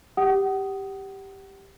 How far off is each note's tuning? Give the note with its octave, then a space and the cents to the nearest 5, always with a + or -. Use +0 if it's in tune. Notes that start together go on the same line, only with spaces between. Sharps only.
G4 +0 F#5 +35 D#6 +0